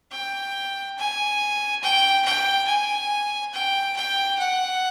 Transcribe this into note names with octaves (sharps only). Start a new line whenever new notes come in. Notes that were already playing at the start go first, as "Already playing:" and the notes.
G5
G#5
G5
G5
G#5
G5
G5
F#5